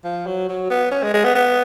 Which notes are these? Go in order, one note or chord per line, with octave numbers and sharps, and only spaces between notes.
F3
F#3
F#3
B3
C#4
G#3
G#3
B3
B3